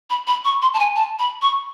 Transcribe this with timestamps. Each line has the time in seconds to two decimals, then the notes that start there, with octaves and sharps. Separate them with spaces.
0.10 B5
0.27 B5
0.45 C#6
0.62 C6
0.74 A5
0.79 G#5
0.96 A5
1.19 B5
1.42 C#6